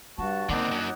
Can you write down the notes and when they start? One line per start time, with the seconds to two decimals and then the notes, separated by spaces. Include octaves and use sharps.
0.18 G2 G3 F#4 A5
0.49 D3 D#3 A#3 C4 D4 D#4 F#5 D6
0.71 F#2 F#3